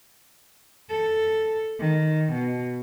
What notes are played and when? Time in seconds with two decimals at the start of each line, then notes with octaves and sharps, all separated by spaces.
0.90 A4
1.80 D#3
2.33 B2